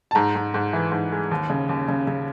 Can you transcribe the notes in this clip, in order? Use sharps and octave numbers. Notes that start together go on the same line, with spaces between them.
A5
G#2 A#5
G#2
G#2
E3
G#2
G#3
D#2
C#3
D#2
C#3
C#3